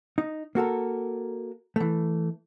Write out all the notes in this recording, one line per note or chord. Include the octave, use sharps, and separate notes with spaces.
D#4
A#3 F#4 A4 A#4
E3 A3